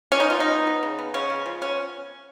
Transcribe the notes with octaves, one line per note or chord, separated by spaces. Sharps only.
C#4
B3 D#4
F4
F3
D#4
B3
B3
C#3
B3
C#3 C#4
C#3
F3
B3 C#4